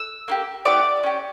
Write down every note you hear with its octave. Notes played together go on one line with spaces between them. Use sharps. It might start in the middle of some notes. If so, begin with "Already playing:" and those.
Already playing: E6
A#3 E4 G4
B3 E4 G4 D5 D6
C#4 G4